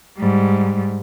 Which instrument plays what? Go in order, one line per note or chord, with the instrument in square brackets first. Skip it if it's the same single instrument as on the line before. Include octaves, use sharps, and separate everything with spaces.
[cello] G#2 G3